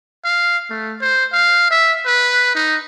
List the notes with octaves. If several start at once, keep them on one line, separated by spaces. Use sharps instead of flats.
F5
A3
C5
F5
E5
B4
D#4